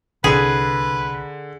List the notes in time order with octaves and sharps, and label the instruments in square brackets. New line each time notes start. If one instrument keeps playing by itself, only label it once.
[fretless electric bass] C2 [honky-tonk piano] D3 [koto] G#4 [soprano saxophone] B4